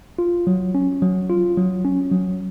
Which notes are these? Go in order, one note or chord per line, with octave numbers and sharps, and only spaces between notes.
F4
F#3
C#4
F#3
F4
F#3
C#4
F#3